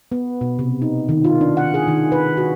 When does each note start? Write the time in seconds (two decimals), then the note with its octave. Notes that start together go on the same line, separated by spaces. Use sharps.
0.12 B3
0.41 B2
0.59 C3
0.82 D#4
1.09 D#3
1.24 F4
1.41 D4
1.57 F#5
1.74 G#4
1.88 D#3
2.12 B4
2.37 F#4